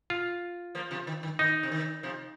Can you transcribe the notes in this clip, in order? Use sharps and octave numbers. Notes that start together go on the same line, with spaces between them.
F4
F3 A#3
C3 F3
D#3
D#3
D#3 D#4
C3
D#3
C3 F3